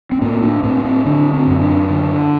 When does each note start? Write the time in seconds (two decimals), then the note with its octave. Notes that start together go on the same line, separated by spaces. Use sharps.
0.12 C4
0.21 A2 A#3
0.42 D4
0.63 A2 C4
0.85 C4
1.05 D3 D4
1.34 C4
1.47 F#2
1.61 D4
1.90 D3